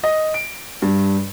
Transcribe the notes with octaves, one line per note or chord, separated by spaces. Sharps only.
D#5
D7
G2